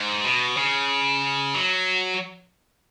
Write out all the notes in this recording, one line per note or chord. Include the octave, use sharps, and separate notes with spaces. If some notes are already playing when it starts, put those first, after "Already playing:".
Already playing: G#2
B2
C#3
F#3